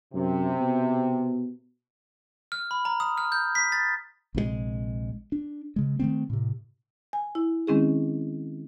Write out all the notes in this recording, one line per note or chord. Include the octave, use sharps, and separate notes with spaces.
F#2 C3
B2
F6
B5
A#5
D#6
F6
G6
B6
A6
A#1 C3 F3 G#3
D4
C#3 G#3
D#3 F3 A3 C4
A2 C3
G#5
E4
D#3 G#3 C4 C#4 E4 G#4